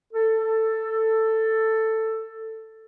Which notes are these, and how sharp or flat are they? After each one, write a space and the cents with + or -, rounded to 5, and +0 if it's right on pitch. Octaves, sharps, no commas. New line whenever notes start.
A4 +10